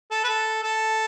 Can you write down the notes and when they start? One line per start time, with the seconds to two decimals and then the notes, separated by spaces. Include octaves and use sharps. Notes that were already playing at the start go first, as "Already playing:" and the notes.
0.11 A4
0.24 B4
0.29 A4
0.63 A4